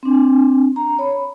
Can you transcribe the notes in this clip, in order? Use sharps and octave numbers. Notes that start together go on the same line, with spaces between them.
C4 D4
A#5
C#5 B5